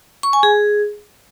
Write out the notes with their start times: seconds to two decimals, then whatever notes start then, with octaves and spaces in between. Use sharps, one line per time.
0.23 C#6
0.33 G#5
0.43 G#4